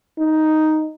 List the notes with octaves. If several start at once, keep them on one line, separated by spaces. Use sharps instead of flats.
D#4